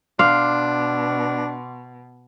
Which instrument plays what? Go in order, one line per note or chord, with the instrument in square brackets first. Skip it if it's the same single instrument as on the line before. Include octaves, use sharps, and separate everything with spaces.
[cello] B2 [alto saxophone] D4 [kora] F5 [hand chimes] C6 D6